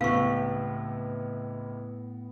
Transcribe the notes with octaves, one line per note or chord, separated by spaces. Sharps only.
C#2 A2 C3 E3 B3 F5 C#6